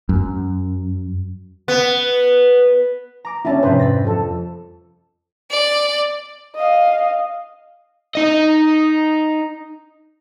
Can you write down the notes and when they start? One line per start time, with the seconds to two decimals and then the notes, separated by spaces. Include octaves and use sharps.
0.09 F#2
1.68 B3
3.25 A#5 D6 A#6
3.45 G3 C#4 D4 E4 B4 A5
3.63 F2 G#2 C3 C#4 B4 C5
3.79 B5 A6 A#6
4.05 F3 A4
5.51 D5
6.55 D#5 F5
8.15 D#4 D#5